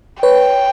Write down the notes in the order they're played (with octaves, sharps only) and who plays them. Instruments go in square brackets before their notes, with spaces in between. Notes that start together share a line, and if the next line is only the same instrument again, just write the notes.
[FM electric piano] B4 C#5 [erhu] G5